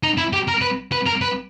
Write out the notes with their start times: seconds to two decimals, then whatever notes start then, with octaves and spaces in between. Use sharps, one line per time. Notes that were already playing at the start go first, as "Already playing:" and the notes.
0.03 D#4
0.18 E4
0.33 G4
0.48 A#4
0.61 B4
0.92 B4
1.06 A#4
1.21 B4